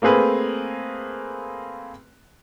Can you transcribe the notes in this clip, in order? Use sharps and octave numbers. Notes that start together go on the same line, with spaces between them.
A3 A#3 C4 G#4 B4